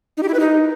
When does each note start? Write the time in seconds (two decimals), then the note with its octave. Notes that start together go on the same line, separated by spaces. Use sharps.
0.17 D#4
0.23 G4
0.28 E4
0.34 B4
0.40 D#4